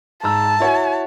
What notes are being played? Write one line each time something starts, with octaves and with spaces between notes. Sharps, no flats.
G#2 A5 A#5 E6
E4 F#4 C#5